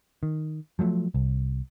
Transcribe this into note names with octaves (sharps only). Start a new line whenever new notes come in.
D#3
F3 F#3 G#3 A3
C2